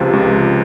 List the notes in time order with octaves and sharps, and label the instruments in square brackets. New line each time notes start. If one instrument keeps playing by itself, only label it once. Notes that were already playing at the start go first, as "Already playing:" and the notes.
Already playing: [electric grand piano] C#2 C3 F3
C#2